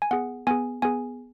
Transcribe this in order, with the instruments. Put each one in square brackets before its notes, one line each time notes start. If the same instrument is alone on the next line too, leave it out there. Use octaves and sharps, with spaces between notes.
[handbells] G#5
B3 G#4 F#5
B3 G#4 G#5
B3 G#4 G#5